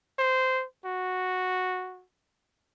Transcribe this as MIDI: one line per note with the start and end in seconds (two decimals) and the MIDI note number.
0.19 0.64 72
0.85 2.04 66